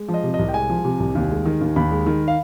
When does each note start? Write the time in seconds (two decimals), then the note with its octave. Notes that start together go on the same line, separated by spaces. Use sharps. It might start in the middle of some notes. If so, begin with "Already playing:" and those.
Already playing: G#3
0.08 F3
0.14 D#5
0.24 C3
0.34 D#5
0.39 C2
0.49 G5
0.54 G#3 G#5
0.70 F3
0.85 C3
1.00 C2
1.15 D#2
1.31 G#3
1.45 D#3
1.61 D#2
1.76 D#2 B5
1.91 G#3
2.06 D#3
2.28 F5